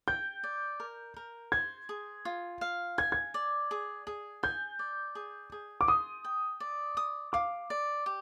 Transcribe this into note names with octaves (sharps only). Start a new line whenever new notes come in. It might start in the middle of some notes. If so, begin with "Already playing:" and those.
G5 G6
D5
A#4
A#4
C5 G#6
G#4
F4
F5
G#5 G#6
G#6
D5
G#4
G#4
G#5 G6
D5
G#4
G#4
D6
C6 D#6
G5
D5
D#6
F5 D6
D5
G4